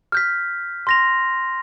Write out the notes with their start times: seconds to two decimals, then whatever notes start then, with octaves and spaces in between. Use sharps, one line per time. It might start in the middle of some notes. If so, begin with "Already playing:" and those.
0.12 F6 G6 B6
0.87 C6 A#6 F7